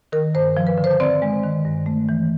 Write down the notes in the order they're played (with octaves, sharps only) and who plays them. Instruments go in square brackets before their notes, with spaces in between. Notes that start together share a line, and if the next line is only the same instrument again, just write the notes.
[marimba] D#3 A#4
G2 C5
F3
B4
D3
C5
C4 D5
G#3
D#3
G2
A3
E3